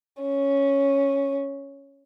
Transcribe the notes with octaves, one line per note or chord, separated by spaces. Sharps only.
C#4